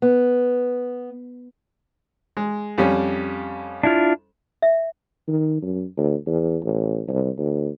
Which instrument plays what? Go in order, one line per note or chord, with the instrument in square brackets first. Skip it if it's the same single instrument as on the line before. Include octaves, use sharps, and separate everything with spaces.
[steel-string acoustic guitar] B3
[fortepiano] G#3
F2 G3 C#4
[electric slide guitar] D4 E4 F4
[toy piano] E5
[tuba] D#3
F#2
D2
E2
A1
C2
D2